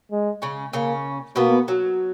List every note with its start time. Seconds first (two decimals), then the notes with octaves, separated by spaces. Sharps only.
0.12 G#3
0.42 C#3 C#4
0.73 C#3 A#3 C#4
1.36 B2 A#3 B3
1.68 F#3